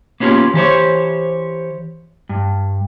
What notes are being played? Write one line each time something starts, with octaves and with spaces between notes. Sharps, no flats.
A#3 B3 C#4 F4 G4
E3 G4 C5 C#5
G2